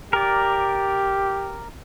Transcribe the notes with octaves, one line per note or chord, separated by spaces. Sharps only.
G4 A#4 D5